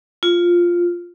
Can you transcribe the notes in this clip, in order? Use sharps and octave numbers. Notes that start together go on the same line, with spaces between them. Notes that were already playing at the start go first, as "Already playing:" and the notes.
F4